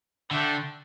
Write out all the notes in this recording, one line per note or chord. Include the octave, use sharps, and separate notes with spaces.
D3 A3 D4 A4 E5 G5